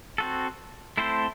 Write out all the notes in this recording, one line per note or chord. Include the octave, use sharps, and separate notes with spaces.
C4 F#4 A4
A3 C4 E4 A4 C5